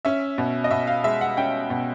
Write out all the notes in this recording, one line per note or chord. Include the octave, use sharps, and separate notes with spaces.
C#4 E5
B2
D#5
B2 E5
F5
G#3 E5
F#5
C#4 G5
B2